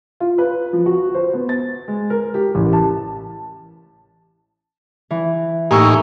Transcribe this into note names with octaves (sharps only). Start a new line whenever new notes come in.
F4
B4
F3
F#4
C5
B3
A6
G#3
A#4
G4
A1
A5
E3
A2 A#3 D#4 G4 G#5 C#6 E6